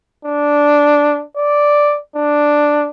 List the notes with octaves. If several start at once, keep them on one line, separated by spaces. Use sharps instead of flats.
D4
D5
D4